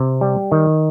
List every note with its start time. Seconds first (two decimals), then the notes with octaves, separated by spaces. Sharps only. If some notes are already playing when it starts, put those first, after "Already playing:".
Already playing: C3
0.21 G3
0.52 D#3